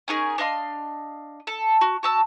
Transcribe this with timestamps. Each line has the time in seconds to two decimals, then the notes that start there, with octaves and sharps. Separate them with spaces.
0.08 C#4 D#4 G#4 A#4
0.38 D4 D#5 F5 C6
1.47 A4
1.81 F#4
2.03 F#4 A5 E6